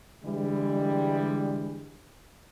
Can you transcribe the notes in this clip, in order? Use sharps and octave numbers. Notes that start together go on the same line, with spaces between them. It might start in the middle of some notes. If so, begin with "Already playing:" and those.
D3 E3 G3 G#3